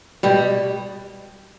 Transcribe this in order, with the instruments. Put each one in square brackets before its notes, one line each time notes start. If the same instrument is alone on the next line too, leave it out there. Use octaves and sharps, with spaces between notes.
[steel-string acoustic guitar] B2 G3